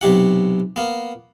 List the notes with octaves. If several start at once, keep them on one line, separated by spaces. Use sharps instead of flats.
B1 C3 G4 F#5
A#3 B3